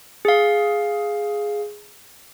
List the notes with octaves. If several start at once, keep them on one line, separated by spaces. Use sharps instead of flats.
G#4 F5